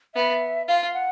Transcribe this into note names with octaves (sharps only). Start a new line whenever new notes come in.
B3 E5
F4 F5
F#5